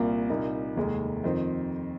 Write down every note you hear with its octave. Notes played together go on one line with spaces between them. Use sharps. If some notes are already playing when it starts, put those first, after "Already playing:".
Already playing: C2 A#2 A#3
C2 A#2 A#3 D#4
F1 D#2 D#3 G#3
F2 D#3 C4 D#4